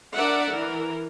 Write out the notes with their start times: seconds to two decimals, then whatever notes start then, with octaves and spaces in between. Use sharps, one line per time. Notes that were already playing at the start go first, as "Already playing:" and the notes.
0.14 D4 A#4 D5 E5 F#5
0.50 E3 A#4